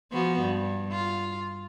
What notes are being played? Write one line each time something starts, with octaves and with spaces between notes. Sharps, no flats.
F3 B3 F#4
G2
F4